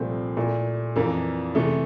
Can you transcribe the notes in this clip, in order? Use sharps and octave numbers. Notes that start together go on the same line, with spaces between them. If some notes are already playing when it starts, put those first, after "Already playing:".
Already playing: C2 A#2 F3 A3 C4
A#2 A3 E4
F2 E3 A#3
C3 E3 A3